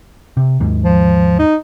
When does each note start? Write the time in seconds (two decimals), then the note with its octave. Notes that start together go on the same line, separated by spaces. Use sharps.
0.37 C3
0.60 D#2 G#2
0.85 F3
1.39 D#4